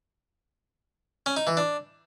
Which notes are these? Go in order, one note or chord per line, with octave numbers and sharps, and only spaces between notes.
C#4
D#4
E3
D4